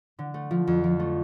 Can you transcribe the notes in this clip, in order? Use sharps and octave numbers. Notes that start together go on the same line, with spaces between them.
D3
A3
F3
F2
F3
A3